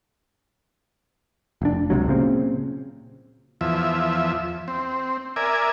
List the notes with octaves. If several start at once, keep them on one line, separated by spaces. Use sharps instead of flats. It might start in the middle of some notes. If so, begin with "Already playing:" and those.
F1 D4
C#2 C3 F#3
A#2 C#3 C4
E2 F3 E5
C4
A#4 D5 E5 G#5